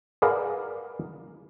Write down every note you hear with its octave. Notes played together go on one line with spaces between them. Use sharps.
G#4 A#4 B4 D5 F5 F#5